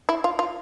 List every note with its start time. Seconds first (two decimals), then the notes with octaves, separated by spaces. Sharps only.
0.09 E4
0.24 F4
0.39 F4